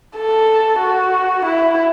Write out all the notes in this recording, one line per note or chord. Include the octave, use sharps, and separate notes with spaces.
A4
F#4
E4